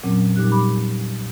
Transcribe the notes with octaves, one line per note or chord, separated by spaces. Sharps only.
F2 A#2 F#3 C4 C#4
A#2 G3 D#4 G4 F#6
G4 B5 D6